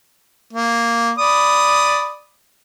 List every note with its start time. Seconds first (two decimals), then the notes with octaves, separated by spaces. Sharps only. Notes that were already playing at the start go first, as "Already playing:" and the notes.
0.53 A#3
1.18 D5 B5 D#6